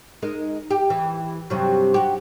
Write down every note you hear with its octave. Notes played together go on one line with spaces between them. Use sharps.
G#3 D#4 A#4
G4
E3
G2 C3 F#3
F#4 G4